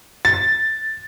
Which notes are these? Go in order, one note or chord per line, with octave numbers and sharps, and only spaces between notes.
A6